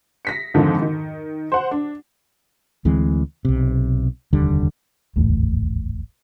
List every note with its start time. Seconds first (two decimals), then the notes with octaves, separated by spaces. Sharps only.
0.25 A#6 B6 C#7
0.54 F2 G#2 D3 D#3 F3
0.82 D#3
1.52 C5 F#5
1.71 D4
2.85 D2 E3 G#3 C4
3.45 B1 C3
4.33 F1 D#2 D3 G3
5.16 D1 G#1 E2 A3